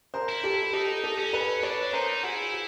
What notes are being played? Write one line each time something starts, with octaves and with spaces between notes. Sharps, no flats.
A#4 C5
E4
G4 A4
D#4 G4 A4
G4 A4
C#4
A4 B4
D4 B4 C#5
D#4 A#4 C5
E4 F#4 G#4
F#4